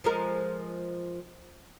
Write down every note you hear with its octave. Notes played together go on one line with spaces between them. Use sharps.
F3 G#3 A#4